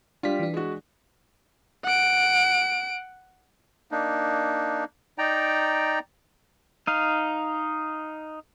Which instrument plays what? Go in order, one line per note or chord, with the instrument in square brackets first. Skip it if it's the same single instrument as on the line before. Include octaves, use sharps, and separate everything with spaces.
[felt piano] G3 F4 [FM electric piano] D4 B6
[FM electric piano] E3 D4
[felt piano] G#3 F#4
[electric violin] F#5 D7
[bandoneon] A#3 D4 D#4
D#4 D5 G5 A#5
[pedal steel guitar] D#4 F5